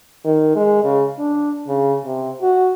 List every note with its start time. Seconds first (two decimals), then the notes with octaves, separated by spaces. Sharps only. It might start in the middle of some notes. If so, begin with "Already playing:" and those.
0.25 D#3
0.56 G#3
0.84 C#3
1.19 D4
1.68 C#3
2.05 C3
2.42 F#4